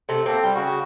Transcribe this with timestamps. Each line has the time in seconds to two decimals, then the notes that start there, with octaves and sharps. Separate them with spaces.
0.09 C3 A3
0.26 A#3 C4 A4 E5
0.44 G3 G5
0.55 C#3 F#4